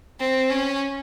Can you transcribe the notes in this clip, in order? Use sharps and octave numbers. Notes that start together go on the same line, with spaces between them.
C4
C#4